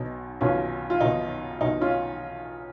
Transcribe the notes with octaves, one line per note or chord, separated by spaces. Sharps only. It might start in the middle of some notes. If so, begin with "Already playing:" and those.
Already playing: B1 B2 D#4
B1 B2 C#4 F4
F4
B1 B2 D#4
B1 B2 D#4
C#4 F4